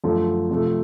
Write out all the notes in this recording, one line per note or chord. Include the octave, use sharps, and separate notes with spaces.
F#2 D3 F3 A3
C3 F3 A3